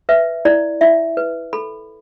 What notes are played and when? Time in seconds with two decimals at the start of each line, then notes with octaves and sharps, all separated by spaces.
0.09 B4 E5
0.45 E4 D5
0.81 E4 E5
1.17 B4
1.53 A4 B5